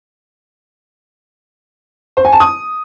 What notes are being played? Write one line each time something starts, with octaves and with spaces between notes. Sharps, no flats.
C5
G#5
A5
D#6